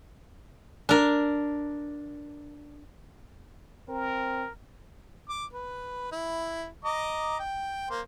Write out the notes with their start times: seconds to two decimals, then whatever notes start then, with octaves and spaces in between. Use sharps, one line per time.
0.89 D4 A#4
3.88 C4 A#4
5.29 D6
5.53 B4
6.12 E4
6.85 D#5 A#5 D6
7.39 G5
7.90 A#3 C5